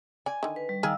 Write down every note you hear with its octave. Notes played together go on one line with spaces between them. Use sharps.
D5 G#5
D3 D#3
B4
G3
D#3 G#4 F5 E6